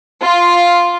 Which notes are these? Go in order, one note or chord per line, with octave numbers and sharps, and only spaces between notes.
F4